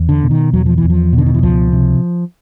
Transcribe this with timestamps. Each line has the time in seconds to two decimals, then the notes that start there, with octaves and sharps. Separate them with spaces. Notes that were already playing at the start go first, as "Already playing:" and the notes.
Already playing: E2
0.09 D3
0.23 B2
0.31 D#3
0.53 E2 F#3
0.66 F3
0.78 E3
0.84 E2
0.90 F3
1.13 B2
1.18 D3
1.26 D#3
1.34 E3
1.43 C#2 F3
1.73 C3